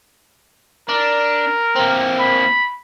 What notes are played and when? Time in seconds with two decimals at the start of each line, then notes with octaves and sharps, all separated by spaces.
0.89 D4 A#4
1.75 A#3 C4
2.19 B5